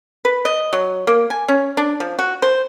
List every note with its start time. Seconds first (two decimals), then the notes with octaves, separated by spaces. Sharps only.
0.25 B4
0.45 D#5
0.73 F#3
1.07 A#3
1.30 G#5
1.48 C#4
1.77 D4
2.00 F3
2.19 F#4
2.42 C5